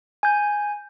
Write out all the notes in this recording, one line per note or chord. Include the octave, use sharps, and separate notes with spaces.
G#5 G6